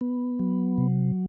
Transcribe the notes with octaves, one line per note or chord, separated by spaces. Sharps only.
B3
F#3
C3